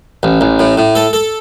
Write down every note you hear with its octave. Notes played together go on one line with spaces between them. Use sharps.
A1
A1
A2
A2
A4
A4